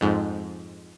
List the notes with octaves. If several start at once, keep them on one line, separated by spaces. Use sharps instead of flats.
F2 G#2